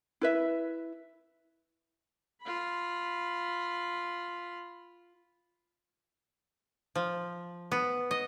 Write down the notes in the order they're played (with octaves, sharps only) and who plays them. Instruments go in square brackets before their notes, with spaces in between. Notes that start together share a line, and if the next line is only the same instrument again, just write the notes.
[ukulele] E4 B4 E5
[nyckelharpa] F4 B5
[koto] F3
B3
D#5